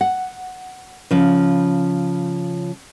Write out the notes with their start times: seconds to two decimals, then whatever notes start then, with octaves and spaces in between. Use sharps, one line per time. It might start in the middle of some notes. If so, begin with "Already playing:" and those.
0.01 F#5
1.11 C#3 F3